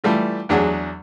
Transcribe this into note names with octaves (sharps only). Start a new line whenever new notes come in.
E3 G3 A3 F4
E2 F#3 D4 G#4 F#5